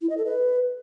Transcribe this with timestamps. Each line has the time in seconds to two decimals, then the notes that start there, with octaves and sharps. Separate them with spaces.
0.02 E4
0.10 D#5
0.18 A4
0.26 B4